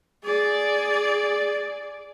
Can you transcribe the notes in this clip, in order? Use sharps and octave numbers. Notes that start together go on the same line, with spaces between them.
G#4 D5